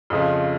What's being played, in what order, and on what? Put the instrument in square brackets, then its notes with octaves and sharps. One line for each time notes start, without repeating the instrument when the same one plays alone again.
[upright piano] F2 C#3 F3